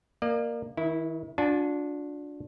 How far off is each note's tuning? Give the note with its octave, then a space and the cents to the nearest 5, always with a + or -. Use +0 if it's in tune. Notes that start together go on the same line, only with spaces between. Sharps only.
A#3 +0 D5 +40
D#3 +35 E4 -10
D4 -5 F4 +45 G#5 +30